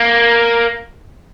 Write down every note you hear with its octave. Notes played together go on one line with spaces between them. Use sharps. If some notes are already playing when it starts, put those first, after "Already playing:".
Already playing: A#3